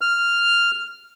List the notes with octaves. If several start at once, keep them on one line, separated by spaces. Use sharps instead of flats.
F6